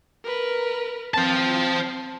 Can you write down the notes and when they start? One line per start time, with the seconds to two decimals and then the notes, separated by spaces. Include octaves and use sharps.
0.24 A#4 B4
1.14 C4 C5 A5